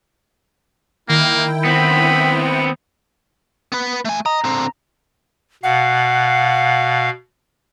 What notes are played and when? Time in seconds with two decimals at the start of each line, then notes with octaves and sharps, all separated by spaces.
1.09 D#3 A#3 E4 G5
1.65 B3 C4 B5
3.72 B3 B4
4.05 A3 G#5
4.26 D#5 A#5
4.44 D3 C4
5.63 B2 F5 F#5